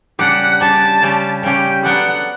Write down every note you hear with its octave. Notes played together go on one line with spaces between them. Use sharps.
C#3 G3 D4 G4 F#5
C#3 G3 D4 G4 A5
C#3 G3 C#4 G4
C#3 G3 C#4 G4 G5
F#3 B3 D4 A4 D5 F#5